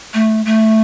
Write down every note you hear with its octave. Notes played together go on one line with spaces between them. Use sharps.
A3
A3